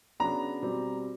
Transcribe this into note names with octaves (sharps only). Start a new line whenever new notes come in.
C#3 F#3 B3 D4 A#5
B2 G3 C4